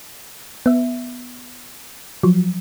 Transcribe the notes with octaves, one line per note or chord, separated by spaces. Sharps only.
B3 E5
F3 F#3